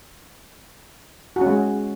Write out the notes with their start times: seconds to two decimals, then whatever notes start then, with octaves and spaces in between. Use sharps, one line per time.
1.36 F#4
1.41 C#4
1.46 G#3